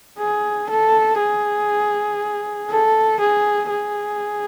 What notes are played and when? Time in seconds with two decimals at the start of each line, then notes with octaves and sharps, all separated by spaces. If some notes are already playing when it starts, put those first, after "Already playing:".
0.18 G#4
0.69 A4
1.19 G#4
2.70 A4
3.20 G#4
3.70 G#4